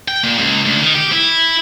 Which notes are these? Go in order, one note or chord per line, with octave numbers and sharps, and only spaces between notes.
G5
A#2
C#2
D2
D#3
G4
E4